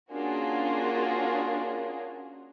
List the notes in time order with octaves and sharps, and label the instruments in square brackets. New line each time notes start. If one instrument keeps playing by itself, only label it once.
[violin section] A#3 C#4 D4 F4 F#4 G#4